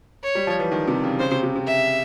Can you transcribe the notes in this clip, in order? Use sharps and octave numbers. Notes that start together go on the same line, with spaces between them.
C#5
G3
F3
E3
D#3
C3
C#3
C#3 C5
C3
C3
C3
E5